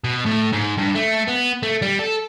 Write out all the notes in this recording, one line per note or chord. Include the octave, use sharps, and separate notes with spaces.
B2
A2
G#2
G2
A3
B3
A3
G3
A4